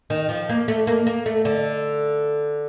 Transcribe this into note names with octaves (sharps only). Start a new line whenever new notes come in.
D#3
F3
A#3
A3
A#3
A#3
A3
D3